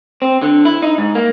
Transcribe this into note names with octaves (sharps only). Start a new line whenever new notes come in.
C4
D3
E4
D#4
G#2
A#3